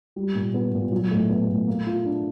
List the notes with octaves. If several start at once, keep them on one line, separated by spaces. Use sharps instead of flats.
G3
A#2
B3
A#2
F#3
A2
B3
A2
A#3
F4
D4